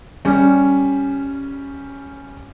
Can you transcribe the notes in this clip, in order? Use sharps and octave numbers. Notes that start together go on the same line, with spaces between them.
G3 C#4